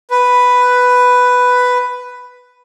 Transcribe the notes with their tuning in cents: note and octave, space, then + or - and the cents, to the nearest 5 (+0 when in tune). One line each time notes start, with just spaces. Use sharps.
B4 +5